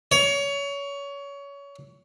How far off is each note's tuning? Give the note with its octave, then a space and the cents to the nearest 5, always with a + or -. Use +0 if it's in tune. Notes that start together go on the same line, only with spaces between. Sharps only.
C#5 +25